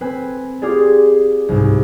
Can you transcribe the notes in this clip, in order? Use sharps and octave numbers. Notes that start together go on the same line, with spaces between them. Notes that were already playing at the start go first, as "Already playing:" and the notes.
C4 B4 G#5
F4 G4 G#4 D5
C2 G#2